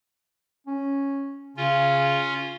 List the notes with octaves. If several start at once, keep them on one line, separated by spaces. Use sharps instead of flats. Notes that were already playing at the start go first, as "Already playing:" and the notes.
C#4
C#3 C#4 F4